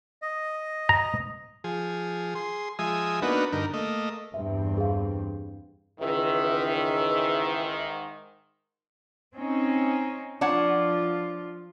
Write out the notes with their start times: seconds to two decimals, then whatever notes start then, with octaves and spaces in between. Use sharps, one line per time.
0.22 D#5
0.89 A#5
1.64 F3 G#4
2.35 G#4 C6
2.79 F3 G#3 E5 G#5 D#6
3.22 A#3 B3 D4 D#4 F#4 B4
3.52 G2 D3 D#4 A#4
3.74 A3 A#3 D#5
4.34 E2 G2 C4 E5
4.77 G#4 F5
6.00 C#2 G#2 D#3 E3 E5
9.34 C4 C#4 D#4
10.41 F3 D4 F4 C#5 F#5